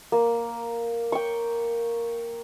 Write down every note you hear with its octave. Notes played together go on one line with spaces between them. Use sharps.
A#3
G5 C#6